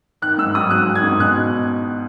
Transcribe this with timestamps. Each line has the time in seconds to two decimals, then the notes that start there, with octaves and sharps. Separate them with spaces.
0.22 D#3 F#6
0.38 G#2 E6
0.55 F#3 D#6
0.71 G#2 F#6
0.88 D#3
0.95 G#6
1.04 G#2
1.20 B2 F#6